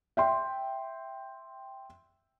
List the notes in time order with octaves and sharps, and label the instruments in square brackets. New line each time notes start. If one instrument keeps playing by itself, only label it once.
[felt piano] E5 G5 C6